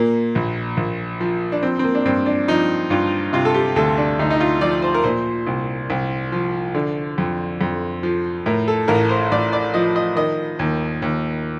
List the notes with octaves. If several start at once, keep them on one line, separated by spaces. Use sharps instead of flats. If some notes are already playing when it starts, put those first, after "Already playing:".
Already playing: A#2 A#3
A#1
A#1
F3
D4
F3 C4
C4
A#3
D4
G2 C4
D4
F3 D#4
G2 F4
C3 F4
A4
G4
D2 A4
D4
D2 D#4
D#4
F4
F3 D5
C5
A#4
A#2 C5
C2
C2
F3
D3
F2
F2
F3
A2 A#4
A4
A1 A#4
C5
A1 D5
D5
F3 D#5
D#5
D#3 D#5
D#2
D#2